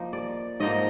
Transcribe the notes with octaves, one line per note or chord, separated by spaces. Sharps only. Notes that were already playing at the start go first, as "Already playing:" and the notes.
Already playing: F3 A#3 D#4
D5
G#2 F3 A#3 D#4 D#5